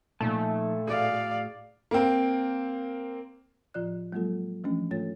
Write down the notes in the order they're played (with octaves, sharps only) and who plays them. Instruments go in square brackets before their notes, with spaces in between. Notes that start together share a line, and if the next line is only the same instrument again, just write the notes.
[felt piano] A#2 [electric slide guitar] F3 D#4 A5 [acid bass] A3
[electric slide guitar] A2 F#4 G#4 [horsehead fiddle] D5 F5
[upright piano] A#3 C4
[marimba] A2 F3 F4 D5 F#6
F#3 G#3 A#3 F4 A4
E3 F3 A3 C#4 D4
G#2 A3 F4 A4 C#5 A6